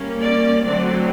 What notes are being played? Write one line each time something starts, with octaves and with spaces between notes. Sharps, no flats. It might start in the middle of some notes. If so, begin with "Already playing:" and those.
Already playing: G3 A#3 C#4
D5
D3 F#3 A3 C4 D5